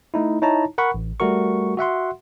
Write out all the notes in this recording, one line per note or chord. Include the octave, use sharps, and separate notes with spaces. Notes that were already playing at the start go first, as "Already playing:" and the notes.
A3 D#4 E4
D#4 E4 C#5 A5 A#5
A#4 F#5 B5 C#6
A1
G3 A3 F#4 A#4 C#6
F#4 E5 F#5 C6